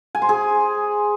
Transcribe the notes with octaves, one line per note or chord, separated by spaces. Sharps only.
G#5
C5
G#4